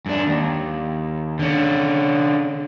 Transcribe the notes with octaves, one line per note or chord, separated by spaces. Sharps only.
F#2 D4
D#2
D3 C#4